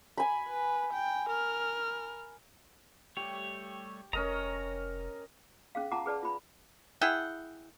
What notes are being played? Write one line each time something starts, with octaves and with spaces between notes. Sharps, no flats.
G#5 B5
B4
G5
A#4 F6
G3 A3 G4 C#5
F1 C#4 A#4 C#5 D#5 A#5
C#4 G#4 F5
F4 F#5 A5 A#5 D6
G#4 B4 D5 A5
F4 B5
E4 G#4 F#5 G5